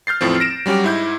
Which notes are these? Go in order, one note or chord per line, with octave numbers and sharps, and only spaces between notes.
F6 G6 A6 C7
E2 A2 F3 C4
A#6 D7 E7
F#3 G3 C#4 F#4 G4
G#2 E4 G6